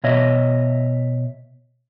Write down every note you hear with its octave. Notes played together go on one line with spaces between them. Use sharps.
B2 C#5 D#5 E5